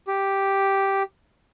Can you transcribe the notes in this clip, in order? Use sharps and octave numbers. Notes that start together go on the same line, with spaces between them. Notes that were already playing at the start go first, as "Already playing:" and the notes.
G4